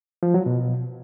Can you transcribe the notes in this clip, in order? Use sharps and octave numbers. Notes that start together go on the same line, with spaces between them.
F3
F#3
B2